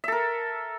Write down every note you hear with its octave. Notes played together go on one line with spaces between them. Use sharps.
A4 A#4 E5